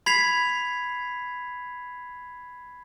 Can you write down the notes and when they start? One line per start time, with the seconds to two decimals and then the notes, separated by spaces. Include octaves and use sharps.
0.06 B5 G#6 B6 C7 F7